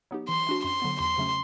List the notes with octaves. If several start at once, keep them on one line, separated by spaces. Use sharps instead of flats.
F#3 B3 D#4 G4
E3 C6
A3 D4 F#4
F#2 C6
D3 F#3 B3
E2 C6
C#3 F#3 A3 C#4